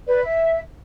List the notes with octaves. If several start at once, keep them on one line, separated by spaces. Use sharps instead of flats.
B4 D5
E5